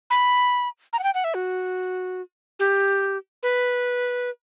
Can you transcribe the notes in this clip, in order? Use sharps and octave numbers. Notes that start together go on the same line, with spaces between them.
B5
A#5
F#5
G5
F#5
E5
F#4
G4
B4